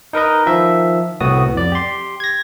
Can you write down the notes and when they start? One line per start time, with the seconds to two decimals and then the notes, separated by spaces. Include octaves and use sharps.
0.13 D#4 A#4 B4 D#5
0.46 D#3 F3 E5
1.21 C2 A2 B3 F#4 D#6
1.55 F2 D5
1.72 G4 C6
2.20 G#6 A#6